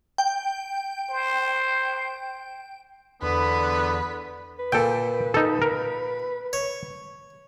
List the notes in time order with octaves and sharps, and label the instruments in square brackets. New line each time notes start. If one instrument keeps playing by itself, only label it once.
[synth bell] G5
[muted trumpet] C5
[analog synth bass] E2 [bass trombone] D3 [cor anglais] B3 [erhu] B4
[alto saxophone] B4
[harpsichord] A#2 [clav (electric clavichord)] A4 G5
[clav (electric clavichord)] D#4 A4
A#4
[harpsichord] C#5